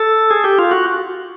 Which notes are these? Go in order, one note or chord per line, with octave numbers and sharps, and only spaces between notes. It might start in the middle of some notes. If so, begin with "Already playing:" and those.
Already playing: A4
G#4
G4
F4
F#4